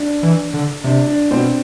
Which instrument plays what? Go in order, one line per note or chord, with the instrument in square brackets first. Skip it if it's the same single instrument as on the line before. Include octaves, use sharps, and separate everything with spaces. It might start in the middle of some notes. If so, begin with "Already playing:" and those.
Already playing: [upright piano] D4
[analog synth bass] E3
D3
[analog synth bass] C3 [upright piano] D4
[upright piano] D4
[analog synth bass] B2 [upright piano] C4